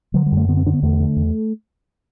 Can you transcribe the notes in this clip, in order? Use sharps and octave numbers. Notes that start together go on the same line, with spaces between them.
D3 F#3
G3
F#2
A3
D3 B3
C4
D3 D4
B3
E2 A3
D3
E2